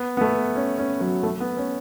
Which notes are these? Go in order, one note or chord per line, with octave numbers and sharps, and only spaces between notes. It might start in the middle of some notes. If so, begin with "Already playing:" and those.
Already playing: B3
B3
A3
C#4
C#4
F#3
A3
B3
C#4